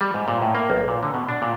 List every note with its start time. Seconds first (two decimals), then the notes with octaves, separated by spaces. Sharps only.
0.01 G3
0.14 G#2
0.28 A#2
0.42 A2
0.55 A#3
0.70 B1
0.88 A#2
1.03 D3
1.14 B2
1.29 D4
1.42 A#2